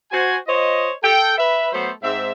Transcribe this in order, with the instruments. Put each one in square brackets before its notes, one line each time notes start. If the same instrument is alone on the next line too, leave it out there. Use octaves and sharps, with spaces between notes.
[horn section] F#4 C5 G#5
F4 C5 C#5 D#5
A4 G5
B4 E5
F#3 A3 B3 A4 C5
G#2 C4 E5